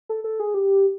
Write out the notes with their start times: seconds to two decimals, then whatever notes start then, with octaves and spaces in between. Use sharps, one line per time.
0.09 A4
0.24 A4
0.40 G#4
0.54 G4